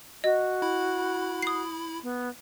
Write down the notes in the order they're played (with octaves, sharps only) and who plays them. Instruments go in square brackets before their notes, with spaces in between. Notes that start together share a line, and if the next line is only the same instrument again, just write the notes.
[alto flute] F#4 [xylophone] D#5
[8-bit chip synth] E4 B5
[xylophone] D#6 C7
[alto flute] B3